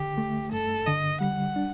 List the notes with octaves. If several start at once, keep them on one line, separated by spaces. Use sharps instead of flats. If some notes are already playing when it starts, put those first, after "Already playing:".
Already playing: D3 G4
A3
G2 A4
D3 D#5
G3 F#5
D4